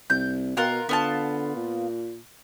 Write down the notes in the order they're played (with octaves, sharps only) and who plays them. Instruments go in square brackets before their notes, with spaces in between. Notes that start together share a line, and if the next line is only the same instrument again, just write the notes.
[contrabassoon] C2 [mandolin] G6
[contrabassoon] B2 [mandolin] F4 A#4 F#5
[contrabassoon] D3 [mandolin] B3 F4 A5
[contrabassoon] A#2